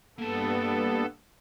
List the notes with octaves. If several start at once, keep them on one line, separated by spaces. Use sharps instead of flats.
G2 A#3 B3 A4 A5